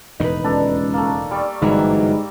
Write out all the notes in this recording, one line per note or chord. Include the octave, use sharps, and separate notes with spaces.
E1 D#2 A2 D#4 B4
C#2 D4 A4 A#5
A3 A#3
G3 C#6
G1 G#2 E3 F#3 G3 A#5 E6